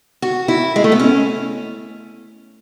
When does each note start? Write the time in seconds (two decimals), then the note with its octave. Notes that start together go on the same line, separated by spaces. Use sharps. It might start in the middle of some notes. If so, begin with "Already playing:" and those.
0.22 F#4
0.48 E4
0.76 G#3
0.84 A3
0.92 B3
1.00 C#4